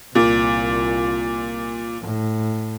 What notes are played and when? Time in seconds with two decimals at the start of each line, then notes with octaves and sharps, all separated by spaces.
0.15 C2 A#2
2.01 A2